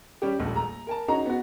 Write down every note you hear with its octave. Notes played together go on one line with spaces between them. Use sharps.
G3 C#4 G4
D#1 A#1 G#3 A3
A#5
A#4 G#5 A5
C#4 D#4 F#4 G#4 D#5 A#5
B3 F#4